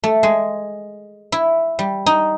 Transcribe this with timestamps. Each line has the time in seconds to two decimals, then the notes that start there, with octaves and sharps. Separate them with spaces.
0.04 A3
0.23 G#3
1.32 E4
1.79 G3
2.06 D#4